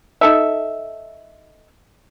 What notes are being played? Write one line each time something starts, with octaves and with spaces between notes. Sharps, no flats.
D#4 A4 E5